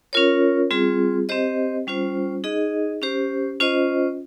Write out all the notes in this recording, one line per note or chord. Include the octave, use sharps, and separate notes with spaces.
C#4 F4 A#4 C#5
G3 C4 F4 G#4
C4 G4 C5 D#5
G3 C#4 F4 C5
D#4 G#4 D#5
C#4 G4 C5
C#4 F4 C5 D#5